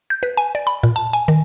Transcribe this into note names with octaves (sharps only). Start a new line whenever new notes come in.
G6
B4
G#5
D5
B5
A#2
A5
G#5
D#3